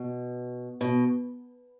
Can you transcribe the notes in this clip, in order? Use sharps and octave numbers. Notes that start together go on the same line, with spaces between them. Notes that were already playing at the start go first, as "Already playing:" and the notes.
Already playing: B2
B2